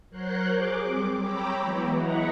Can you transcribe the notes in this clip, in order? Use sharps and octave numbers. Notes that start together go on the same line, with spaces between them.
F#3 A#4 C5 C#5 C6 F#6
G#4 D6
G3 C4 D6
C#5 G5 A#5 B5 D6 E6
E3 F#3 G#3 B3
E4 D#5 F#5 A#5 B5 C#6